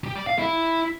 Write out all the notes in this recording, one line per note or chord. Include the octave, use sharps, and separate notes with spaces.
G4
D5
F5
E4